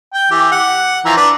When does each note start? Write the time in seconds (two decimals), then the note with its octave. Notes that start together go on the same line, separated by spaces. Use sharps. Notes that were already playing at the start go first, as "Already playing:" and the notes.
0.13 G5
0.31 E3 G4
0.52 F#5
1.05 E3 F3 A#5
1.17 D4 B4 D5